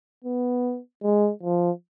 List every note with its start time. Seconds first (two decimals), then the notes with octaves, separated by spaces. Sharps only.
0.24 B3
1.03 G#3
1.43 F3